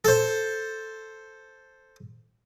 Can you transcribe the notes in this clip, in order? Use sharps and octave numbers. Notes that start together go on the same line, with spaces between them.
A4 C5